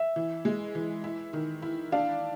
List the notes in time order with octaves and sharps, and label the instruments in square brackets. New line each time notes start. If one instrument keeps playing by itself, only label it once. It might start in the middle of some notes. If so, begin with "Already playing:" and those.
Already playing: [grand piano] E5
[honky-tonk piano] E3
G#3
E3
E4
D#3
E4
[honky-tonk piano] D4 [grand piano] F5